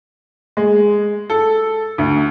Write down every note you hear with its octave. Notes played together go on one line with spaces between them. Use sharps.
G#3
A4
D2